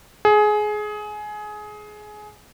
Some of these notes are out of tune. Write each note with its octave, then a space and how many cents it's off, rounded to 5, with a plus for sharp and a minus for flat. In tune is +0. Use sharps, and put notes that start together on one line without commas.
G#4 +20